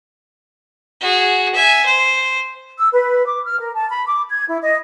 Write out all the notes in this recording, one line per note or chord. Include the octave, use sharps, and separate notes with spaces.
F#4 G#4
E5 G#5
C5
E6
B4
D6
F6
A#4
A5
B5
D6
G#6
E4
D#5